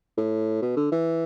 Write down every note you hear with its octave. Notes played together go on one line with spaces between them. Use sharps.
A2
B2
D3
E3